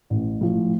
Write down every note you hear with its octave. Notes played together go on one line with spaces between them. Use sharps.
A1
A2 F3